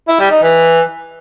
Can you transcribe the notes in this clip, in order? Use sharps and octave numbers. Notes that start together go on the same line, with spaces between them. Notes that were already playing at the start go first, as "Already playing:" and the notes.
E4
G3
D#4
E3